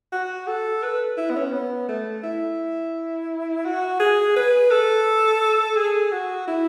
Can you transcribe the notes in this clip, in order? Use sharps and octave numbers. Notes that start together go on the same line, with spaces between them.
F#4
A4
B4
E4
B3
C#4
B3
A3
E4
F#4
G#4
B4
A4
G#4
F#4
E4